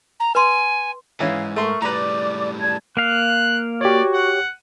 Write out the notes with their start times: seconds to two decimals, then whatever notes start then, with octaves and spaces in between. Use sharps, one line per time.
0.20 A#5
0.35 B4 G#5 C6
1.20 G#2 E3 C#4 F5
1.56 A3 A#4 C6 C#6
1.82 A2 G3 B4 D5 A#5 D6
2.60 D5 A5 G#6
2.97 A#3 F5 F#6
3.81 F#4 G4 C#5 D5
4.14 F#5